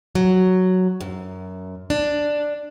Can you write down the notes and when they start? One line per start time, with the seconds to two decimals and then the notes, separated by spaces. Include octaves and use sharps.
0.15 F#3
1.01 F#2
1.90 D4